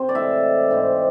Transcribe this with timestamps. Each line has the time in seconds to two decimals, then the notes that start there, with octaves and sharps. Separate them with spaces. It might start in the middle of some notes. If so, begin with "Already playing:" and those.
Already playing: C3 C4 C5
0.09 D5
0.15 A2 E3 G#3 E5
0.70 G#2 G#3 C4